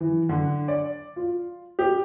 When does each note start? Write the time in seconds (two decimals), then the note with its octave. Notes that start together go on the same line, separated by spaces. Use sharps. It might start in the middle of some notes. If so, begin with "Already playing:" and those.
0.01 E3
0.29 D3
0.68 D5
1.16 F4
1.79 G4